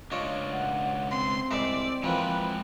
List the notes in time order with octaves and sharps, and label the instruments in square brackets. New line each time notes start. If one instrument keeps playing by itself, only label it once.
[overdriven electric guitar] C#2 D4 [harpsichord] F4 C#5 D#5
[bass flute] F#5
[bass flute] C4 [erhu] C6
[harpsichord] C2 G#3 E5 [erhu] D5
[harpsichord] E3 F3 A#3 [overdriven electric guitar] G#3 G5 [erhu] B4